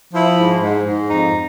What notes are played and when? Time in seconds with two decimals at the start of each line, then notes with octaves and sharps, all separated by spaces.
0.14 F3 E4
0.38 G#2
0.61 G#2
0.86 G#2
1.09 F2 D#4